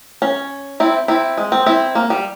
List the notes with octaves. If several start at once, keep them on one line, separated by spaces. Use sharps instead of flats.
C#4
C4 E4
C4 E4
G#3
C4
C4 E4
A#3
G3